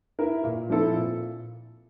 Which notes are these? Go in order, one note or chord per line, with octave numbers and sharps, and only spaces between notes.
E4 A#4 E5
A#2
F3 C4 E4 A4
A#2